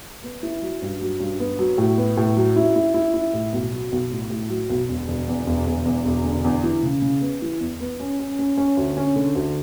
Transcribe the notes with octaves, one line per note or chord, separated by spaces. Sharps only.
B3
E4
F#3
G2
F#3
G2
B3
F#3
A2
B3
A2
F#3
E4
E4
E4
E4
A2
B1
F#3
B1
A2
A2
F#3
B1
E1
E1
E2
E1
E1
E2
E1
D3
E2
E3
C#3
C#3
B3
E3
E2
B3
C#4
C#4
C#4
C#4
D2
C#4
D3
D2